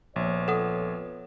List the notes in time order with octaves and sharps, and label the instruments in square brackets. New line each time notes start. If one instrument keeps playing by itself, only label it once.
[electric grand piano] A#1 [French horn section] F2 B3 C#5
[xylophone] A4 F#5 D#6